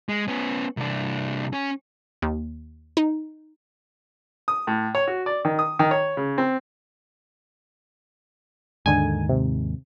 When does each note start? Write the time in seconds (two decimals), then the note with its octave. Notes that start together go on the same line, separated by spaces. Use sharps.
0.09 G#3
0.28 B3 C#4
0.77 C2 D4
1.53 C#4
2.22 D#2
2.97 D#4
4.48 D#6
4.67 A2
4.95 C#5
5.08 F#4
5.26 D5
5.45 D#3
5.59 D#6
5.79 D#3
5.91 C#5
6.17 C#3
6.38 C4
8.86 D#2 G#2 D3 G#5
9.29 C3